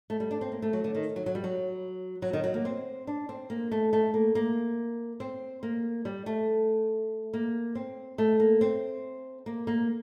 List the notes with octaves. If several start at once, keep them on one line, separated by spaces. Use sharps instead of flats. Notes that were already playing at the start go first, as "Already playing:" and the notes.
A3
G3
D4
C4
A#3
A3
F#3
D3
D#3
F#3
F#3
G3
F#3
F#3
D#3
F#3
A#3
C4
D4
C4
A#3
A3
A3
A#3
A#3
C4
A#3
G3
A3
A#3
C4
A3
A#3
C4
A#3
A#3